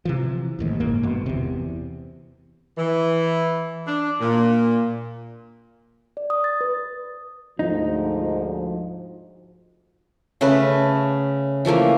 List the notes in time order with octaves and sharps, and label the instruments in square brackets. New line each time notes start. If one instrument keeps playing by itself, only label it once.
[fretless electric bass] C3 E3 F3
A1 D#2 G#2
F#1 G#2 A#3
G1 B2
E2 C3
[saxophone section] E3
D4
A#2
[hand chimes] D5
D#6
A6
B4
[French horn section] D2 G#2 F3 [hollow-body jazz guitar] D#4
[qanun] C#3 A3 C#4 B4
E3 F3 A3 A#3